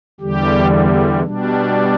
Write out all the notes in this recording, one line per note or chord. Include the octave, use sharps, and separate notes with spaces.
E2 D3 G3 G4
B2 G3 D4